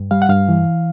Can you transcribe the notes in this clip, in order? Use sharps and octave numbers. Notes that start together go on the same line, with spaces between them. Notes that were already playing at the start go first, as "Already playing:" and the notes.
Already playing: G2
G3 F5
F#5
G2 F5
E3